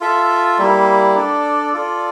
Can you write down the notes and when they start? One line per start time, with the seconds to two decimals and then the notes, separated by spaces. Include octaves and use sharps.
0.01 F4 A4 E5
0.58 G3 A#3 E4
1.15 D4 A4 D5
1.74 F4 A4 D5